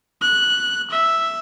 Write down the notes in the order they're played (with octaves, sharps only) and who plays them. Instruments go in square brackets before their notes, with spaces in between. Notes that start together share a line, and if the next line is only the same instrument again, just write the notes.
[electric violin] F#6
E5